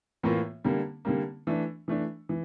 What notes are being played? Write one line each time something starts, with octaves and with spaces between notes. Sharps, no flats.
A2 E3 A#3 F4
D3 G3 A#3
D3 G3 A#3
E3 A3 D4
E3 A3 D4
E3